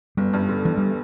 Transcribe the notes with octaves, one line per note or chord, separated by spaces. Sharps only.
G1 G3
G2
D3
G1 E3
G3